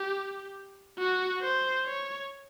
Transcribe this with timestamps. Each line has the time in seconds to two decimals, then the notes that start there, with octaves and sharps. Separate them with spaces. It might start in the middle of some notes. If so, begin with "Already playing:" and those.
Already playing: G4
0.99 F#4
1.41 C5
1.85 C#5